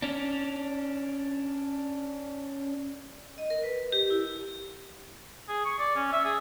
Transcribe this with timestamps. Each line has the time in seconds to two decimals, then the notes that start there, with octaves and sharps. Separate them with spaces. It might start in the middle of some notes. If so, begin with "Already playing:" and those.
0.02 C#4 D4
3.38 D#5
3.50 A#4
3.64 B4
3.92 G4
4.10 E4
5.48 G#4
5.65 C#6
5.79 D5
5.96 C#4
6.13 E5
6.25 G#4